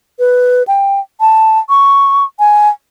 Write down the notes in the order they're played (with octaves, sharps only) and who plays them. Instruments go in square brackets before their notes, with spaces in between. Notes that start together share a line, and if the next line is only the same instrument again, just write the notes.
[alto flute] B4
G5
A5
C#6
G#5